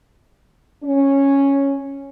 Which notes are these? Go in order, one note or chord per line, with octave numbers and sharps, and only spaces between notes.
C#4